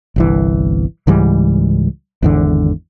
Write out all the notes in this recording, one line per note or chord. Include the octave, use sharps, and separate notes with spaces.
G1 C2 E3
C#2 G#2 E3 G3
G#1 E2 D3